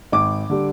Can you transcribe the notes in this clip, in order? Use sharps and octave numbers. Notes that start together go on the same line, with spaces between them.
G#1 D6
D3 G3